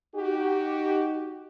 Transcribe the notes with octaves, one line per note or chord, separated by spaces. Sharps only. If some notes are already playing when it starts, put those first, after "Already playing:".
D#4 F#4 G4